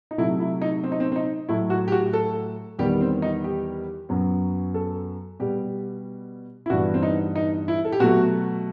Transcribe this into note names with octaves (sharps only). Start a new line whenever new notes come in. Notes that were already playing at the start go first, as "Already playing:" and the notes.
D#4
C3 F#3 A3 E4
E4
D#4
C4
D#4
C4
C4
D#4
A2 F#3 A3 E4
F#4
G4
F#4
A4
E2 D#3 G3 B3 G4
C4
D#4
G4
F#2 F#3 B3
A4
B2 G3 B3 G4
E4
G2 E3 B3 F#4
C4
D#4
D#4
E4
A4
G4
B2 F#3 A3 F#4